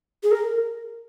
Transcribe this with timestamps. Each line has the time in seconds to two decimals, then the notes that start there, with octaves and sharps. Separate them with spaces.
0.23 G#4
0.31 A#4